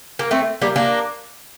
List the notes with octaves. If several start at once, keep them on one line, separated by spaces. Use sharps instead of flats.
A#3
A3 C4
G3 A#3
A#3 D4